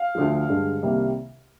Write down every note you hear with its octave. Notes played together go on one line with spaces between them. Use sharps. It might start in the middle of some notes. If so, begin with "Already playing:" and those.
Already playing: F5
D2 D3 F3
G2 D3 G#3
C2 C3 D#3 G3 A#3